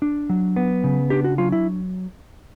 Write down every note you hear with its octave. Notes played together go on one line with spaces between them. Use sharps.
D4
F#3
B3
C#3
D4 G4
F#4
F#3 F4
E4